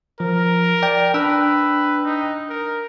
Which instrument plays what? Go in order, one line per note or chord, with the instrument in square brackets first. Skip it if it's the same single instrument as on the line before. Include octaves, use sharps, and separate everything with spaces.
[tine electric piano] F3 [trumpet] A#4
[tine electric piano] D5 G5
[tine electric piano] D4 G5 E6 [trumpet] B4
[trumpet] D#4
A#4